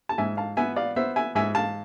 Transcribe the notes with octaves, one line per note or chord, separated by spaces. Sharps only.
A5
G#2 E5 G#5
F5 A5
B3 E5 G#5
D5 F5
B3 C5 E5
E5 G#5
G#2 E5 G#5
F5 A5